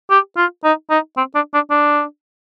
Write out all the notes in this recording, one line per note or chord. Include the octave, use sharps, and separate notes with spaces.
G4
F4
D#4
D#4
C4
D4
D4
D4